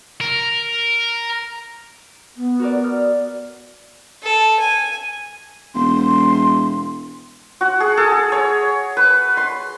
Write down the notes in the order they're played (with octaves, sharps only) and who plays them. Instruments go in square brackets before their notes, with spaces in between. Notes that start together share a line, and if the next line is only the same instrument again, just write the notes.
[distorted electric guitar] A#4
[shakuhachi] B3
[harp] F#4 A#4 D5
F6
[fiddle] A4
G#5
[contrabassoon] E1 [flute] C6
[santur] F#4
G#4
A4
G#4
C#5
B4
C6